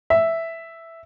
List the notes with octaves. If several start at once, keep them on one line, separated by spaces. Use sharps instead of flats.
E5